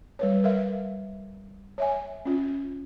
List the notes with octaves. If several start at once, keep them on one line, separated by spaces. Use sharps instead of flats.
G3 B4 C#5
A#4 E5 F5
C#5 E5 G#5
C#4 F4